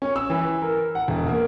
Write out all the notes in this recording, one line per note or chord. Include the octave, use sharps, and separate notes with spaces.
C#4
E6
E3
A#4
F#5
E1
A#3